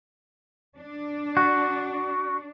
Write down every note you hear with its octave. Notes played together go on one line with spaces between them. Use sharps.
D4
F#4